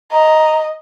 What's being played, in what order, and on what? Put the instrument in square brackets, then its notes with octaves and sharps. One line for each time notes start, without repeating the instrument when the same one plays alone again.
[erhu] D#5 [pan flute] A#5